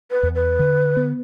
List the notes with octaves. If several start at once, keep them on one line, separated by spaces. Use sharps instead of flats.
B4
E2
B4
D3
B3